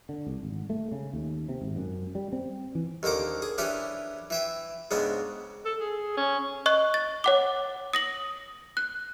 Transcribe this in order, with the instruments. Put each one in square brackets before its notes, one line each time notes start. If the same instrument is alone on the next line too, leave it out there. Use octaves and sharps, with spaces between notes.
[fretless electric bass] D3
C2
G#1
A3
C#3
D#2
C3
G#1
F#2
G3
C4
E3
[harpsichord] D#2 D3 A#3 C5 D6
G#4
E3 C#4 D4 G4 B4
E3 E5 G5
G#2 C#3 B3 C4 D4
[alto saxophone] A4
G#4
C#4
[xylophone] D#5 C#6 F#6
A6
C#5 F#5 D6
D#6 A#6 F#7
F#6